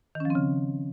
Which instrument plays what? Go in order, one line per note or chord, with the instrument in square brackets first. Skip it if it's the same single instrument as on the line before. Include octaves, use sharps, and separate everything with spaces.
[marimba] D#3
C#4
F3
C4
C#3